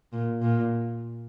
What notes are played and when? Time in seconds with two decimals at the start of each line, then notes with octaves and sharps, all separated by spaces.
0.13 A#2
0.41 A#2